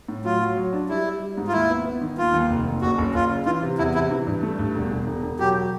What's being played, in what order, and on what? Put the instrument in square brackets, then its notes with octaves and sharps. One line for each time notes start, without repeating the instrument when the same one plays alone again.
[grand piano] A2
[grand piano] F#3 [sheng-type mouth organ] F4
[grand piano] F#3
F#3
D4
[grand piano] G3 [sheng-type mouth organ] E4
[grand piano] G3
G3
G#2
[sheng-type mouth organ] F4
[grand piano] D#2 [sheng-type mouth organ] E4
[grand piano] B3
B3
D#3
[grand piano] D#2 [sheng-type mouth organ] F4
[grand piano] D#2
F1
D#2
[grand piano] F#1 [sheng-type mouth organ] F#4
[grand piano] F#1
[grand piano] F#1 [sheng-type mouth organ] F4
[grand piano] C#3
[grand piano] E3 [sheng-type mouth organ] F4
[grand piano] C3
[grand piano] E2 [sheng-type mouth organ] E4
[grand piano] C3 [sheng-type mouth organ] E4
[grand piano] E3
G2
A3
G2
E1
E1
E1
E1
[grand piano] F#3 [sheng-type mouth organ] G4